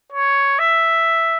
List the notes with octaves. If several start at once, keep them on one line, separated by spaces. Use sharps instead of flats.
C#5
E5